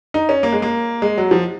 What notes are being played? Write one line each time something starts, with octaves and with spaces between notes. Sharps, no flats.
D#4
C#4
A#3
G#3
A#3
G#3
F#3
F3